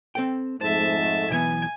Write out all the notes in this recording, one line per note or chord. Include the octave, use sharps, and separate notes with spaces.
C4 A4 G5
F2 G#2 A3 C5 E5 A5
B1 E3 B3 G#5